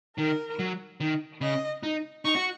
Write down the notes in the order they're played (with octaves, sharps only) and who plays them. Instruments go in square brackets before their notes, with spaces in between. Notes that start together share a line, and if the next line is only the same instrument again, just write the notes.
[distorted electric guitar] D#3 [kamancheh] A#4
[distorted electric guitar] F#3
D#3
[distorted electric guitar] C#3 [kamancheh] D#5
[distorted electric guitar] D#4
[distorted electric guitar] D#4 [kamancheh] C#6
[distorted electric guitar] F#4